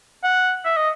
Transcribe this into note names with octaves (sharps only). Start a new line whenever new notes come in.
F#5
E5
D#5